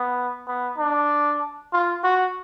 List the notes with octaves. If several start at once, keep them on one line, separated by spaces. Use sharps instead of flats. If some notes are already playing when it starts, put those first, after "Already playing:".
Already playing: B3
B3
D4
F4
F#4